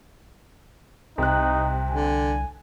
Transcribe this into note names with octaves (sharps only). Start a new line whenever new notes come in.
C2 C3 D#4 F#6
D3 G#5